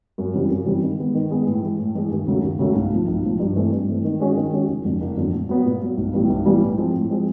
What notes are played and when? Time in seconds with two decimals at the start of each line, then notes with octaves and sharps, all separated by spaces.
0.18 F#2
0.34 C#3 E3 G3 C4
0.50 F#2
0.66 C#3 E3 G3 C4
0.82 D#3
0.98 G#3 B3
1.15 D#3
1.30 G#3 B3
1.46 A2
1.63 E3 G#3
1.79 A2
1.95 E3 G#3
2.11 D#2
2.27 C#3 F#3 A3
2.43 D#2
2.59 C#3 F#3 A3
2.75 B1
2.91 A2 F3
3.07 B1
3.24 A2 F3
3.40 G2
3.56 E3 A3 C4
3.72 G2
3.88 E3 A3 C4
4.04 D#3
4.20 G#3 C#4 F#4
4.36 D#3
4.52 G#3 C#4 F#4
4.68 F#1
4.85 F2 D3 F#3
5.01 F#1
5.17 F2 D3 F#3
5.33 A#2
5.49 F#3 B3
5.65 A#2
5.81 F#3 B3
5.97 B1
6.13 A2 E3 G3 B3
6.29 B1
6.46 A2 E3 G3 B3
6.62 A2
6.78 F3 G#3 C4
6.94 A2
7.10 F3 G#3 C4